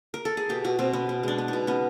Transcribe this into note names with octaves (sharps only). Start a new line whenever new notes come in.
A#4
A4
G#4
B2 G4
B2 F#4
B2 C4
B3 C#4
B3
G#3 D4
B3
B2 D#4
B3 C#4